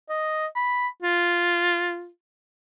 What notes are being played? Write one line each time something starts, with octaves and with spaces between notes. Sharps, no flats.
D#5
B5
F4